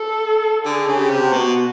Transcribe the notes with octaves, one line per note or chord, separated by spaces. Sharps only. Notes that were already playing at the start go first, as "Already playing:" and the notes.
Already playing: A4
D3 G#4
C#3
G4
C3
F#4
B2